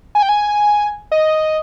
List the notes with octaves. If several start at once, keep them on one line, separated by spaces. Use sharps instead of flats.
G#5
G5
G#5
D#5